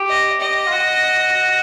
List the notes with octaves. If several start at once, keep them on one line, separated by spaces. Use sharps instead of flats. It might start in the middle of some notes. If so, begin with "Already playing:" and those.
Already playing: G4
D#5
G4 D#5
F4
F#4